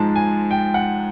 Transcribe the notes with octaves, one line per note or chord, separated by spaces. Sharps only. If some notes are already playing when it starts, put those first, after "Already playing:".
Already playing: G#2 F3 G#3 A5
G#5
G5
F#5